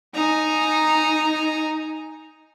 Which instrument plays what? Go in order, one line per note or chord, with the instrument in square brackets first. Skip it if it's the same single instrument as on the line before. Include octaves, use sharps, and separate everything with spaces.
[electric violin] D#4 [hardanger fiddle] G#5 A#5